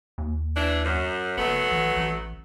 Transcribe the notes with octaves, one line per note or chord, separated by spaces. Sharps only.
D#2
E3 D4
F#2
G1 F#3 A3 B3
A1
A1